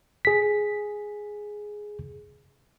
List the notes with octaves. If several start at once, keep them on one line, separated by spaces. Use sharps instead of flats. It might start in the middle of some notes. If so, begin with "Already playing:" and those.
G#4 B6